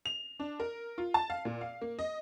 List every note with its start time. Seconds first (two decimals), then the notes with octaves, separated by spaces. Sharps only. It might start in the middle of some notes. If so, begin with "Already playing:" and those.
0.06 F7
0.40 D4
0.60 A#4
0.98 F4
1.14 A5
1.30 F5
1.45 A#2
1.61 F5
1.82 A#3
1.99 D#5